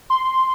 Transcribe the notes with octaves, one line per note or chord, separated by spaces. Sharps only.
C6